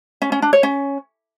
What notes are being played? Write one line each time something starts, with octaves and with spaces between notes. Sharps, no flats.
C#4
C#4
D4
C#5
C#4